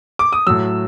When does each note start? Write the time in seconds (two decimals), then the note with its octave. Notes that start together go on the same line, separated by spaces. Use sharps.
0.19 D6
0.33 D#6
0.47 A2 F#3 E6